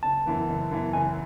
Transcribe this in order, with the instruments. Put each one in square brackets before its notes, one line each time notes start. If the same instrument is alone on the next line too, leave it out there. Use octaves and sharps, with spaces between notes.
[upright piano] F#1 [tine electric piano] A5
[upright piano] F#2 E3 B3
F#1
F#2 E3 B3
[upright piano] F#1 [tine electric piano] G#5